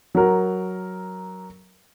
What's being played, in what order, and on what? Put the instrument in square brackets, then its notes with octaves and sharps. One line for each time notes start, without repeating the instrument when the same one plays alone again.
[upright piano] F#3 A#4